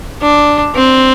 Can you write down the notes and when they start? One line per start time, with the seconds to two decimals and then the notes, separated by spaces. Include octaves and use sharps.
0.22 D4
0.75 C4